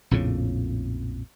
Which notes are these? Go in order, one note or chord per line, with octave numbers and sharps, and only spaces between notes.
A#1 F2 A2 C#3